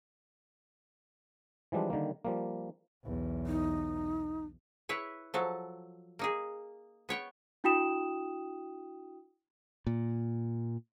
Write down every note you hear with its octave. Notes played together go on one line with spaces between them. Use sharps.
E3 F3 G3 G#3 D4
D3 D#3 G3 A#3
F3 G3 A#3
B1 E2
D#4
E4 B4 C#5
F3 F#3 A4
A#3 D#4 G#4
B3 C#5 G5
D4 E4 F#4 G5 D#6 E7
A#2